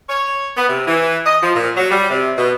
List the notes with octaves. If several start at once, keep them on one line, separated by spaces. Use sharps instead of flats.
C#5
B3
C3
E3
D#5
F3
A#2
F#3
G3
C3
B2